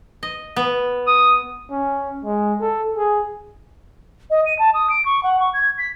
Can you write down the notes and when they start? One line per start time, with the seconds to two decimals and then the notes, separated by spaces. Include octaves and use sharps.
0.23 D#5
0.56 B3
1.07 D#6
1.70 C#4
2.24 G#3
2.60 A4
2.97 G#4
4.30 D#5
4.46 D#7
4.59 A5
4.74 D#6
4.90 D7
5.05 C#6
5.23 F#5
5.40 C#6
5.54 G#6
5.78 B6